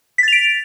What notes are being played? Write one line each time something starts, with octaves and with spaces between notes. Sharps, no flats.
A6 B6 D7 F7